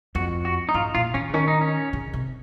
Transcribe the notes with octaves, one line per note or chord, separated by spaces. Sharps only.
F2 F#4
F#4
D#4
G#2 F4
A#2 F4
D#3 C#4
C#3
D#3 C#4
D#4
C#4
C#3
C3